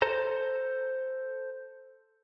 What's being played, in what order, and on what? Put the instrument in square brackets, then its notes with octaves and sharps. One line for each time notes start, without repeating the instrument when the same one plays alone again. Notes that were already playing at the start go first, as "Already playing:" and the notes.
[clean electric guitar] A4 C5 A#5